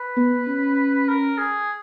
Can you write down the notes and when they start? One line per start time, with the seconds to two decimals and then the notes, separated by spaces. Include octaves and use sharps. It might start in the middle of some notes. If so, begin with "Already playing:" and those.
Already playing: B4
0.17 B3
0.47 C#4
1.09 A#4
1.38 G#4